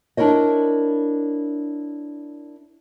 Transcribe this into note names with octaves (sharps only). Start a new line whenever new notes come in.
D4 E4 A#4 C#5 D#5